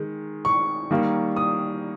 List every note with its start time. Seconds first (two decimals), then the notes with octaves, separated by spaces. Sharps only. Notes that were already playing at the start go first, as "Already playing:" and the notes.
Already playing: D#3 G#3
0.45 C#6
0.91 D#3 G3 A#3
1.36 D#6